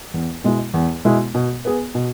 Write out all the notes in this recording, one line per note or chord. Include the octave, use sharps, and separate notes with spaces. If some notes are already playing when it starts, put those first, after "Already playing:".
E2
B2 G#3 E4
E2
B2 G#3 E4
B2
B3 G#4
B2